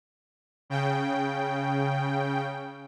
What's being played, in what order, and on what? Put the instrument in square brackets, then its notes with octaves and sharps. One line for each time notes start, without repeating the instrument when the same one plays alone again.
[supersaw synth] C#3 G5